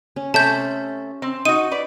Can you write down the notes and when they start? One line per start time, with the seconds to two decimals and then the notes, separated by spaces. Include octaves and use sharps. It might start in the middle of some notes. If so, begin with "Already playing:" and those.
0.16 C#4
0.34 C3 A3 C#4 A5 G6
1.22 C4
1.45 D#4 F#4 D#7
1.71 B4 D5